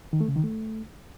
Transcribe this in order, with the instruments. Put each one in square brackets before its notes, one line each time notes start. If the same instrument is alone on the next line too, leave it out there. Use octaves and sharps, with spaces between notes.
[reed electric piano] D#3
A3
C#3
D#3
A3